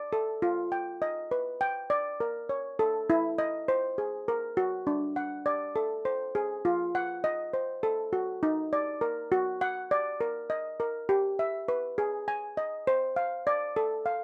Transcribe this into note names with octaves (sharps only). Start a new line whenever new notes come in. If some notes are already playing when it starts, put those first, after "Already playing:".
Already playing: D5
A4
F4
G5
D#5
B4
G5
D5
A#4
C#5
A4
E4
D#5
C5
G#4
A#4
F#4
D4
F#5
D5
A4
C5
G#4
F4
F#5
D#5
C5
A4
F#4
D#4
D5
A#4
F#4
F#5
D5
A#4
D#5
A#4
G4
E5
B4
G#4
G#5
D#5
C5
F5
D5
A4
F5